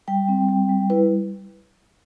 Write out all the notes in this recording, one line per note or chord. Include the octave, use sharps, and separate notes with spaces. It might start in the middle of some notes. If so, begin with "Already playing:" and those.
G3 G5
C4
G3
G3
E4 B4